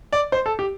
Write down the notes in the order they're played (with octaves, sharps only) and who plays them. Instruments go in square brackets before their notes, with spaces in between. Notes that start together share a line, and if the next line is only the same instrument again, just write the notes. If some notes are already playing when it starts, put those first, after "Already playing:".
[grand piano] D5
C5
A4
G4